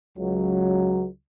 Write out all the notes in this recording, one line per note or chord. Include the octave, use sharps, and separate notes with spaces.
C#2 F#3